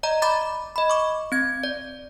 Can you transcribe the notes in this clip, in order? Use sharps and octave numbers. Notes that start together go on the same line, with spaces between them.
D5 D#5 A#5
D5 B5 D6 A6
D#5 B5
C#6 D6
C4 G#6
D5